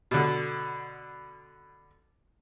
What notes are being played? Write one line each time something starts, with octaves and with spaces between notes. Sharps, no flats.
B2 D3